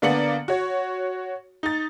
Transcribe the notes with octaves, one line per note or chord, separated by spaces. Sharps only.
D3 A#3 B3 D5 C#7 F#7
F#4 C#5
D#4 A6